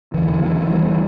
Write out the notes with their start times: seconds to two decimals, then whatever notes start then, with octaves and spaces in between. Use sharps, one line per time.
0.14 E2 D3 E3
0.42 E3
0.70 E3 G3